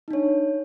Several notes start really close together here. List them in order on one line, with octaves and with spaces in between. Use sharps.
D#4 D4 C#5